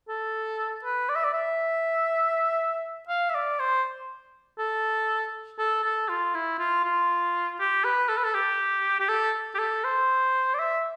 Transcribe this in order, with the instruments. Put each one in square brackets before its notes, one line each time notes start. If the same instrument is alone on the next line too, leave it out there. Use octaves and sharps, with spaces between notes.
[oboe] A4
B4
D5
E5
D5
E5
F5
E5
D5
C5
A4
A4
A4
F4
E4
F4
F4
G4
B4
A4
B4
A4
G4
G4
A4
G4
A4
C5
D5
E5